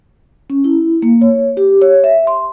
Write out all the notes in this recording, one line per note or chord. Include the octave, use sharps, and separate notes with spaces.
C#4
E4
A#3
C#5
G4
C#5
E5
C6